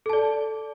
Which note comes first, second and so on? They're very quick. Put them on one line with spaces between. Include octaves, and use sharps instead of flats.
A4 A5 D5